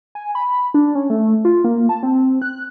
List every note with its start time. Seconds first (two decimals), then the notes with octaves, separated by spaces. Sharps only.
0.15 G#5
0.35 B5
0.74 D4
0.95 C#4
1.10 A3
1.45 F4
1.64 A#3
1.89 A5
2.03 C4
2.42 F#6